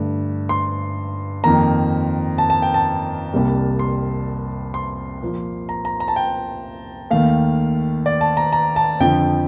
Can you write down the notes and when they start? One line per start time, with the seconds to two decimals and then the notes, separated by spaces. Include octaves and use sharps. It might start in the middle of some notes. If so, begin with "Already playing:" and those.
Already playing: G2 D3 A3
0.49 C6
1.44 F2 D#3 A#3 A#5
2.38 A5
2.50 A5
2.62 G5
2.74 A5
3.33 C2 C3 G3 A#3
3.79 C6
4.74 C6
5.22 A#2 F3 A#3
5.69 A#5
5.85 A#5
6.00 A#5
6.08 A5
6.16 G5
7.11 D#2 D#3 A3 F5
8.06 D5
8.21 A5
8.37 A#5
8.53 A#5
8.76 A5
9.00 F2 D3 F3 G5